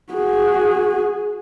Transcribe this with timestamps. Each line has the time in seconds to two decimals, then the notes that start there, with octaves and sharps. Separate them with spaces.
0.13 F#4 G#4